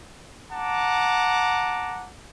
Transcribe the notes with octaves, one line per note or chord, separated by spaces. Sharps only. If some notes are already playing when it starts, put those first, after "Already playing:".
F#5 A5 A#5 D6